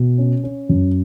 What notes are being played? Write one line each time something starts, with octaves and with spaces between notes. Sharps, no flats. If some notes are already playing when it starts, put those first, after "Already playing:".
Already playing: B2
C#4
C#4
F#2